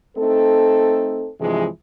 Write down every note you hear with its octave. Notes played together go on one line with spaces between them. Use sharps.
A3 C4 D#4 A4
G2 C3 E3 F3 G#3